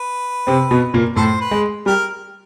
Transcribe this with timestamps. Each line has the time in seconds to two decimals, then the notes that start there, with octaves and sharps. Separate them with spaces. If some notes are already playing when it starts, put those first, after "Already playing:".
Already playing: B4
0.47 C3 C4
0.71 B2 B3
0.94 A#2 A#3
1.16 A2 A3 A4 C5
1.41 B4
1.51 G#3
1.86 G3 G4 A#4